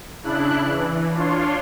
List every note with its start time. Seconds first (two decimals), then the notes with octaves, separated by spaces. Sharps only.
0.22 C#3 D4 E4 F#6
0.62 E3
1.13 D4 F4 C#5 C6